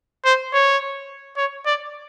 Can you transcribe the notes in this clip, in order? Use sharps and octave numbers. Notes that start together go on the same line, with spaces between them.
C5
C#5
C#5
D5